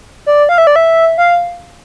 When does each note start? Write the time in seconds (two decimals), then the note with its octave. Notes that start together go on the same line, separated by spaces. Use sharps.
0.26 D5
0.49 F5
0.58 E5
0.67 D5
0.76 E5
1.18 F5